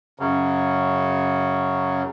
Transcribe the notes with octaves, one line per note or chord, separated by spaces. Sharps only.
F#2 C#3